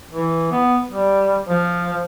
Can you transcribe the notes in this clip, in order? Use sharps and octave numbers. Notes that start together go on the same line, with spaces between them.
E3
B3
G3
F3